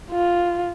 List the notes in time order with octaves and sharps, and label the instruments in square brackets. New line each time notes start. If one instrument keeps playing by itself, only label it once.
[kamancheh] F4